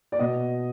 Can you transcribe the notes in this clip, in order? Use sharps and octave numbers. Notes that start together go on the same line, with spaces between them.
D5
B2 D#5